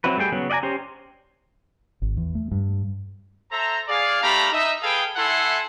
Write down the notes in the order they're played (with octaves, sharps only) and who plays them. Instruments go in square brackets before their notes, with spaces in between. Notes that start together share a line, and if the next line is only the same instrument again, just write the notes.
[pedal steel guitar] F#3 C4 E4 F#4 B4
G3 A3 G#4 G5
C#3 F#3 B3
D5 D#5 F#5 G#5 A#5
C#4 G4 C5
[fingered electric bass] G#1
E2
A3
G2
[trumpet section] A4 C5 E5 A#5
G#4 D5 F5
A3 D4 G4 F5 A#5 B5
D#4 D#5 E5
G#4 A4 B4 F5 G5
E4 A4 E5 F#5 G#5 C6